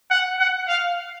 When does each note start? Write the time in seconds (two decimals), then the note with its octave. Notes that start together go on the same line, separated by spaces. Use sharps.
0.11 F#5
0.39 F#5
0.68 F5